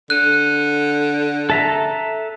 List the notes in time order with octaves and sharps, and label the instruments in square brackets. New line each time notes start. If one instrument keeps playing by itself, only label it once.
[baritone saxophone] D3 [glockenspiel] F#6 D#7
[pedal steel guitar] A4 E5 A#5